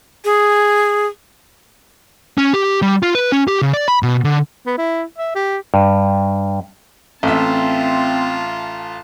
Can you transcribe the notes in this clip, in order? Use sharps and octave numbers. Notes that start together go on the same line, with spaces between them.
G#4
C#4
G4
G3
F4
B4
C#4
G4
C#3
D5
B5
B2
D3
B3
E4
E5
G4
G2
A1 C4 F4 E5 A5